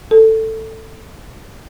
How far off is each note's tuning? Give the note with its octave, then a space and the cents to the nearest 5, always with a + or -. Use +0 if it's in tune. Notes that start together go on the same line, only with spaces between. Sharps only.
A4 +10